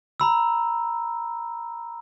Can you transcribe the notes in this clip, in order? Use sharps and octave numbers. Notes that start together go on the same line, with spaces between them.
A#5 B5 E6